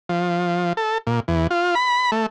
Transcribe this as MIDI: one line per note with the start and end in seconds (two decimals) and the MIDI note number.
0.09 0.73 53
0.77 0.98 69
1.07 1.20 46
1.28 1.47 40
1.51 1.75 65
1.75 2.11 83
2.12 2.26 57